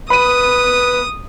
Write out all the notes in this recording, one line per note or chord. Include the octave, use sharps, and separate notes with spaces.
B4 B5 D#6 D#7